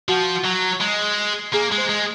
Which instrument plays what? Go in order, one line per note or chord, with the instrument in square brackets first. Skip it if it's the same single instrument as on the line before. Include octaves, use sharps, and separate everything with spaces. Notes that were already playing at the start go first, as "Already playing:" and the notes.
[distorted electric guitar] F3 [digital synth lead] F#4
[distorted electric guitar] F#3
G#3
[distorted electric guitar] A#3 [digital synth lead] G#4
[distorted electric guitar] G#3
[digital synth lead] C5
[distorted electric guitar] G#3